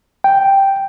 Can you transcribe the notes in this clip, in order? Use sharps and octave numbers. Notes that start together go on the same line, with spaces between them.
G5